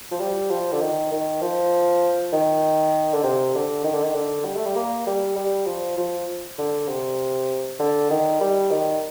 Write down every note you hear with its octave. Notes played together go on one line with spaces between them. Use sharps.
F3
G3
F3
D3
D#3
D#3
F3
D#3
D3
C3
D3
D#3
D3
D#3
D3
G3
A3
G3
A#3
G3
G3
F3
F3
D3
C3
D3
D#3
G3
D#3